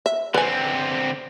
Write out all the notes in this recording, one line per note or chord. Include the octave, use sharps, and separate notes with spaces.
E5
D3 C4 B4 G#5